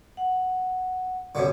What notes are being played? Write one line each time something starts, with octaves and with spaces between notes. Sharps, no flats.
F#5
F#2 B2 D3